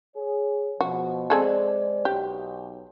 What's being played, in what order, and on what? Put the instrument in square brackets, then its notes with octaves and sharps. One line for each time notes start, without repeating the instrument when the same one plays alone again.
[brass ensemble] G#4 C#5
[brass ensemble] B2 F3 [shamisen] F#4
[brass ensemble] G#3 C5 D5 [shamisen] C4 G#4 A4
[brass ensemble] B1 [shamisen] G4